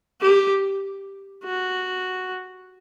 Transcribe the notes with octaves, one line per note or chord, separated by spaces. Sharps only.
G4
F#4